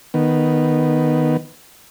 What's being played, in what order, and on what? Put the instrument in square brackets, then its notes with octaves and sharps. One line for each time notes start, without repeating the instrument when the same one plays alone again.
[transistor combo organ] D#3 B3